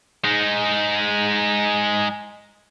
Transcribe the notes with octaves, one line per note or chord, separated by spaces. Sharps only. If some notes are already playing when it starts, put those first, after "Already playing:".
G#3 D#4